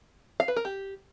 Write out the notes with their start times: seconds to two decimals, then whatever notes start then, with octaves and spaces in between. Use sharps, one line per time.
0.40 F5
0.48 B4
0.56 A#4
0.65 G4